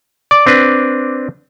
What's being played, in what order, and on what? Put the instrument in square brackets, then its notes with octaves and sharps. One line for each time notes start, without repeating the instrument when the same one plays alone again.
[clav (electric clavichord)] D5 [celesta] D6
[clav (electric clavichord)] C4 D4 B4